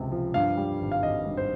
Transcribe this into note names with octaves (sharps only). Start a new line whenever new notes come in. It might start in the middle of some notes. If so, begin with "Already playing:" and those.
Already playing: C#2 C3 F3 G#3
F3
G2 F5
G3
G#1
F5
G#1 D#5
G2
C5